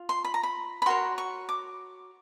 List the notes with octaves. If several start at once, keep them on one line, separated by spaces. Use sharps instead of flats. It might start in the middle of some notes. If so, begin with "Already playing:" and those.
Already playing: F4
C6
B5
A#5
B5
B5
F#4 A#4 C#5 C6
C#6
D6